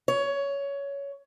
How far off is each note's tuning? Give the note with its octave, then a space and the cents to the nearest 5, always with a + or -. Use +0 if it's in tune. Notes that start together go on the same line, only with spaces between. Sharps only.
C#5 +15